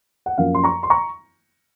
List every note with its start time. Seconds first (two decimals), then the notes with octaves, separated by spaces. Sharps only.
0.26 F#5
0.38 F#2 F3 A#3 F5
0.55 C6
0.64 A#5 C#6
0.83 C6
0.90 A#5 C#6